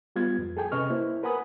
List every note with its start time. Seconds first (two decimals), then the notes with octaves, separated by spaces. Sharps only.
0.16 G3 B3 F4 G#6
0.39 F2
0.57 G#4 A4 G5 G#5
0.72 C3 C#4 B4 D#5 C#6 F6
0.90 A#3 E4 C5
1.23 A#4 B4 F#5 G#5 B5 D#6